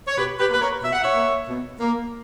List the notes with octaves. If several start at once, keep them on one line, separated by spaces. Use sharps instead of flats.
C#5
B2 G4 B4
G4 B4
A#3 B4
A#4 C#5
B2 E5
F#5
C#5 E5
A#3
B2
A#3